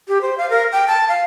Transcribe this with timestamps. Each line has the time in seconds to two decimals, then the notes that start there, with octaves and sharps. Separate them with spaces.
0.08 G4
0.21 C5
0.38 F5
0.50 A#4
0.72 G5
0.88 A5
1.08 F5